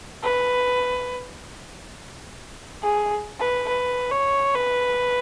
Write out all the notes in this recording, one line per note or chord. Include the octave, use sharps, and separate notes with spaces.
B4
G#4
B4
B4
C#5
B4